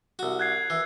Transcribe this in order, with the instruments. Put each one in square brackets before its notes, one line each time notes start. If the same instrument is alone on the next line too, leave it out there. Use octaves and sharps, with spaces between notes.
[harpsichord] C2 F#4
[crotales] F#6 G#6 C7
[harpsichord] E3